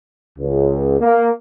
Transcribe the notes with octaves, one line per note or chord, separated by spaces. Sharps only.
C#2
A#3